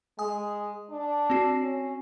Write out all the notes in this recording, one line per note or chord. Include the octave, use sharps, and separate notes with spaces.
G#3 G#5 D#6
D4
C4 F#4 C7
C#4